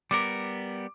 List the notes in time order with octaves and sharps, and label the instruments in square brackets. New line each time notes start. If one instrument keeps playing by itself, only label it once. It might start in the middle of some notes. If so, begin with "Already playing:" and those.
[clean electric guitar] G3 B3 A#4 [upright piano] D6